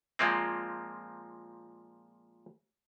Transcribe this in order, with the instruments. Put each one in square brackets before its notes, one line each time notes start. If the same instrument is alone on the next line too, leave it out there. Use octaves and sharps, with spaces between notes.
[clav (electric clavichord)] A#2 F3 G#3 A#3 C4